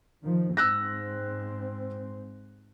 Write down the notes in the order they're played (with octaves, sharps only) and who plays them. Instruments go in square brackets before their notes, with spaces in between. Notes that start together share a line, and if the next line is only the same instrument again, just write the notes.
[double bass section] D#3 F3
[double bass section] G#2 C4 [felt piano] E6 F#6 A#6